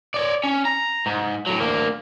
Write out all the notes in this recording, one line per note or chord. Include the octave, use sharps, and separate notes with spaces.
C#5 D5
C#4
A#5
G#2
A2 F#3
D2 A#3